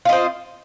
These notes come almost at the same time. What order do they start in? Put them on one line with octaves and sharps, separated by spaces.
F4 D#5 C4